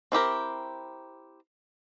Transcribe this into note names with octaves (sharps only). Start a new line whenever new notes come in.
C4 E4 G4 A#4